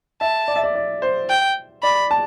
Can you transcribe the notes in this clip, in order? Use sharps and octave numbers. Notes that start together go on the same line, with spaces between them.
E5 A5
D5
E5
D5
D5
C5
G5
D5 B5
A5